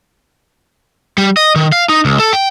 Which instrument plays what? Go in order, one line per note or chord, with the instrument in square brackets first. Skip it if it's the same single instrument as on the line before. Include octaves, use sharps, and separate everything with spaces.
[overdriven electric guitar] G3
D#5
D#3
F5
D#4
C#2
A4
G5